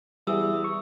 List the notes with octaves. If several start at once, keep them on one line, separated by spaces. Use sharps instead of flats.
E2 E3 G3 D#6 E6
C#6